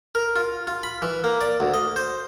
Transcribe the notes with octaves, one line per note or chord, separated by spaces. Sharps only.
A#4
F4
F4
B5
E3
A#3
D5
D2
D#5
C5